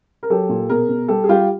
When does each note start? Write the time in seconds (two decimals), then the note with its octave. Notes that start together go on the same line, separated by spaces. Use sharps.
0.23 A#4
0.30 F#3 G4 A4
0.49 A#2
0.70 B2 G#4 A#4
0.89 B2
1.08 G3 G4 A4
1.24 G#4
1.29 G3 F4 G4